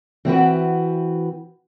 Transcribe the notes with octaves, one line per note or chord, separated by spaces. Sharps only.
E3 C4 F#4 B4